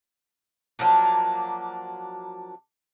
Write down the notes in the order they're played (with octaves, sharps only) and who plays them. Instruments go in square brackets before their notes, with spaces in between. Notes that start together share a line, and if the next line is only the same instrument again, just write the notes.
[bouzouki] F3 F#3 A#3 D4